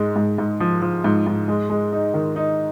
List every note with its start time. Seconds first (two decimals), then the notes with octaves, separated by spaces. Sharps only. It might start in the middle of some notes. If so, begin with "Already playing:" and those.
Already playing: G#2 G#3
0.16 G#2
0.38 G#2
0.60 F3
0.82 F3
1.04 G#2
1.27 G#2
1.48 G#3
1.70 G#3
1.92 D#4
2.14 D#3
2.36 D#4